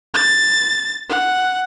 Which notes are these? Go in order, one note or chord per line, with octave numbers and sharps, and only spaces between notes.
A6
F#5